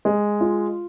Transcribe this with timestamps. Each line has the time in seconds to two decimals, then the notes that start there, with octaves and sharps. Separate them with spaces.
0.05 G#3
0.41 F4